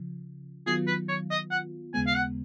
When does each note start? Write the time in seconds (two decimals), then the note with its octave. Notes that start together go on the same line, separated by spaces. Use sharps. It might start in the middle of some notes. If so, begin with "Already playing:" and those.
Already playing: C#3 F3
0.66 D#3 F#3 B3 F4 G#4
0.87 B4
1.09 C#5
1.31 D#5
1.51 F#5
1.94 D#2 C#3 G#3 B3 G#5
2.07 F5
2.16 F#5